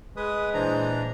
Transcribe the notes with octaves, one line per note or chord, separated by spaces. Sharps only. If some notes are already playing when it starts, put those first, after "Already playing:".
G#3 B4 D#6
A#2 E3 D4 C5 A#5